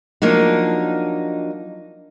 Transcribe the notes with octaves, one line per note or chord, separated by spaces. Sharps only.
F3 F#3 A#3 D4 D#4